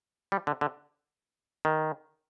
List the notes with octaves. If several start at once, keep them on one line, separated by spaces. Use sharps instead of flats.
G3
D3
D3
D#3